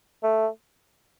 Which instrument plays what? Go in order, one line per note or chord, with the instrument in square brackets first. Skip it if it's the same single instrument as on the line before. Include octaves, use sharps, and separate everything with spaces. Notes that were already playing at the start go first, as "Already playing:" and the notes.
[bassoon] A3